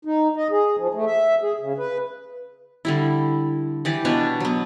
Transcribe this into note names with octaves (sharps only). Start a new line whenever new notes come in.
D#4
D#5
G#4
F3
A3
E5
G#4
C#3
B4
D3 G3 E4
E3 G4 D5
B2 D4 B4 C#5
F#3 B3